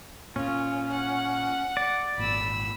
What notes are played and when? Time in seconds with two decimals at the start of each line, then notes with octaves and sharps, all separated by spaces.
0.36 A#2 C#4 F4
0.92 F#5
1.77 D5
2.18 G#1 A#2 B5 E6